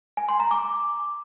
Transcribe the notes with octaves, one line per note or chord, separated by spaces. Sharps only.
G#5
C6
A#5
D6